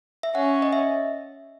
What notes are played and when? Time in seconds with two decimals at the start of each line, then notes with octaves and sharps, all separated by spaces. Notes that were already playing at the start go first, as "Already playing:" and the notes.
0.23 E5
0.35 C#4 F#5
0.62 D#5
0.73 E5